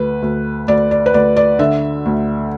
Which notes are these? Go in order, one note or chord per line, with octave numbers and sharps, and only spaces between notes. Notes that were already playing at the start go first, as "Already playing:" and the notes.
Already playing: D2 B4
D2
D2 D5
D5
B4
D2 D5
D5
D3 E5
D2